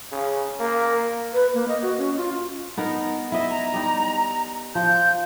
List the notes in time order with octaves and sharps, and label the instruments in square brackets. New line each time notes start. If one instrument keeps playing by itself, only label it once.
[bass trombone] C#3
A#3
[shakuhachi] B4
A#3
D#5
F#4
C#4
F4
[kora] B3 D#4 A#4
[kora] E4 D#5 [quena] E5
[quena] A#5
[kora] G3 D#4
[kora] F3 [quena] G6